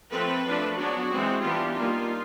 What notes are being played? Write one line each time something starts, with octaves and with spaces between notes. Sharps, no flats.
F3 A3 C4 A4 B4
F3 A3 D4
F#3 B3 D4 F#4 G#4
E3 G#3 C4
E3 G3 B3 D4 F4 G4
G3 A#3 D4 D#4 F4